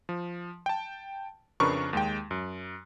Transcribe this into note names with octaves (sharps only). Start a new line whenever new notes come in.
F3
G5 A5
F2 C#3 D4 A#4 B4 C#6
D#2 G#3 G5
F#2